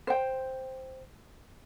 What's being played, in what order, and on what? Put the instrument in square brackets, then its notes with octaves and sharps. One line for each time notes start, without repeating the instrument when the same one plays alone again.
[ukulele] C5 G5